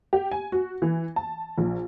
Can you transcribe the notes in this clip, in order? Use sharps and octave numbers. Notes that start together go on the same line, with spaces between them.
G4
G#5
F#4
E3
A5
A#1